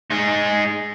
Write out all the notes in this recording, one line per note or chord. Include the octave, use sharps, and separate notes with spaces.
G#3 D#4